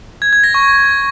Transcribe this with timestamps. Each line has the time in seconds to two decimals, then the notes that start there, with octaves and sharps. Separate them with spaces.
0.22 G#6
0.33 G#6
0.44 A#6
0.54 C#6